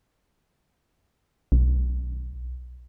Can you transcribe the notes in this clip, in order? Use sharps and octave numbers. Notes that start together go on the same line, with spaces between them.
B1